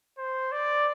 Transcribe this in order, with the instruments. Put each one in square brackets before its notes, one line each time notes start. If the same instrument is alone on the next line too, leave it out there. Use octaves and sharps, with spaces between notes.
[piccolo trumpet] C5
D5